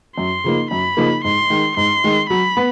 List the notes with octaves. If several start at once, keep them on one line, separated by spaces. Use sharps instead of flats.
F#2 C6
C#3 F3 A#3 D#4
F#2 B5
C#3 F3 A#3 D#4
G#2 C6
D#3 G#3
G#2 C6
D#3 G#3
F#3 B5
B3